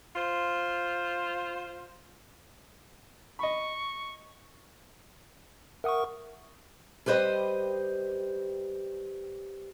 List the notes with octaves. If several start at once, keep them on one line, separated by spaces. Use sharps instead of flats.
F4 C5
D#5 B5 C#6
A#4 E5 F#5 C#6 D#6
G3 G4 B4 C5 D#5